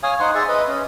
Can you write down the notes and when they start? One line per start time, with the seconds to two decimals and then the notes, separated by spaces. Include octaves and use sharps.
0.03 C#5 F5 G#5 D#6
0.20 D#4 C5 F#5 C6
0.35 G#4 C5 D5 E5
0.48 B4 D#5
0.68 C#4